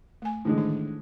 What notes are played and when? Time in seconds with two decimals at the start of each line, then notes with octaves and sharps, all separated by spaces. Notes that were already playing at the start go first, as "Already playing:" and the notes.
0.22 A3 G#5
0.45 A2 D3 E3 G#3
0.58 D#3 D#4